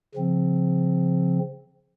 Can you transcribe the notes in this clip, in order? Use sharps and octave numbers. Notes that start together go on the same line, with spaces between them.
C#3 F3 C4